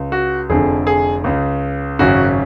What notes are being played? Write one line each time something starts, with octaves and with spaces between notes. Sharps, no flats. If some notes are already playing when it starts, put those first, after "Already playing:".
Already playing: C#2 C#3
F#4
F1 F2 D3 G#4
G#4
C#2 C#3
G#1 F#2 C#3 F#4